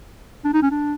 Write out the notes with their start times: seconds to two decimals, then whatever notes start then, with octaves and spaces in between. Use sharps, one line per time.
0.44 D4
0.53 D#4
0.62 C#4
0.71 D4